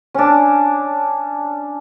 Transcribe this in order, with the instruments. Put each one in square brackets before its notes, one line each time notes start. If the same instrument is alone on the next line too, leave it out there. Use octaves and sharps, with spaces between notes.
[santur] C#4 D4